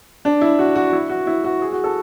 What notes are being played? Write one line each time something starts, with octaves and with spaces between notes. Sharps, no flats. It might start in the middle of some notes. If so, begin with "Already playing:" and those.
D4
E4
F#4
F#4
E4
F#4
E4
F#4
G#4
F#4
A4